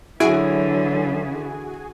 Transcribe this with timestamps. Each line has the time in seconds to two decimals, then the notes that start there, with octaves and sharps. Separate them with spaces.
0.20 D3 E3 F#3 E4 F#4 G#4 G#5 D7